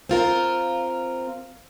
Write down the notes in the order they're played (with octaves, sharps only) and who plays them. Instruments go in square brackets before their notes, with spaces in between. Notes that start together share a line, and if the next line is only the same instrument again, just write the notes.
[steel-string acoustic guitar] C4 F4 A#4